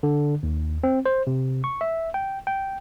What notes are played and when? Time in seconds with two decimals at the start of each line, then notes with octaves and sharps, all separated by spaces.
0.03 D3
0.43 D#2
0.84 C4
1.06 C5
1.27 C3
1.64 C#6
1.81 E5
2.14 G5
2.47 G5